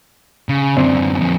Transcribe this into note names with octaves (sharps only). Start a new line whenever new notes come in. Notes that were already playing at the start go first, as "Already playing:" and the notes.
C#3
F#2 D3 C4 D5 E5
F2 A#3